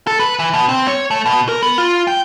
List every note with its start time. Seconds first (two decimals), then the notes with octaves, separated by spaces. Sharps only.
0.07 A4
0.19 B4
0.39 E3
0.53 B2
0.69 C4
0.87 C#5
1.11 A3
1.26 B2
1.49 A#4
1.63 B3
1.78 F4
2.07 G5